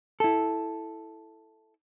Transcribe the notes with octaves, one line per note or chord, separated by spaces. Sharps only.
E4 A4